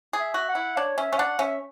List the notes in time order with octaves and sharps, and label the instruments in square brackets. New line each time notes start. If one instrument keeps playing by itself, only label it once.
[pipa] G#4
[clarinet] E5
[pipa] F#4
[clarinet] F#5
[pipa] E4
[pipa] D4 [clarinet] C#5
[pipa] C#4 [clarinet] E5
[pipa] C#4
[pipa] D4 [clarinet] F#5
[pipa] C#4 [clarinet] E5